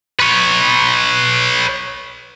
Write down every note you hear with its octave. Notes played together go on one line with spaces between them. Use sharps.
B4 C#5